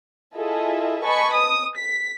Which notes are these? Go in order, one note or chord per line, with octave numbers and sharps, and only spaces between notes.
E4 F4 G#4 A4 D#5 E5
B4 D#5 G#5 A5 B5 C#6
D#6
B6